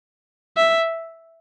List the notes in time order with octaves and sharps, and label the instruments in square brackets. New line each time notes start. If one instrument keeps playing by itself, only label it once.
[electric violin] E5